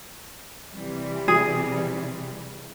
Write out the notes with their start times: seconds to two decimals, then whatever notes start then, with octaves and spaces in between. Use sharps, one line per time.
0.73 C3 E3 G3
1.28 G#4